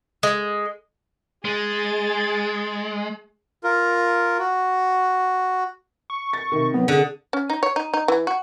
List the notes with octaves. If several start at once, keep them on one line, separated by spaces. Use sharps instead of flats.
G#3
G#3 G#4 A6
F4 A#4
F#4
C#6
A6
C3 D#3
F#3 B3
D3 G#4 F#5
C#4
D#4
C#5
D#4
D#4
E3
F#4